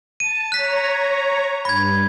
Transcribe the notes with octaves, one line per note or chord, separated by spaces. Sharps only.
A5 D#7
C#5 A#5 F#6 B6
G2 B5 G#6